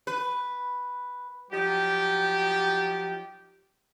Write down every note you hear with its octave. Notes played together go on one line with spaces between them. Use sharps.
B4
F3 F#3 D#4 G4